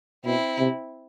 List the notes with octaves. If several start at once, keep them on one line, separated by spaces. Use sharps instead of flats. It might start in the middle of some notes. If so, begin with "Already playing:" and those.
B2 C4 E4
C3